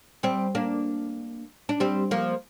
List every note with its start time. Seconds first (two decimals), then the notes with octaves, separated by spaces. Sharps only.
0.23 G3 C4
0.55 A#3 D4
1.69 D4
1.80 G3 C4
2.11 F3 A#3